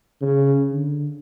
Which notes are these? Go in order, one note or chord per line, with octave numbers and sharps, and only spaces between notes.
C#3
D3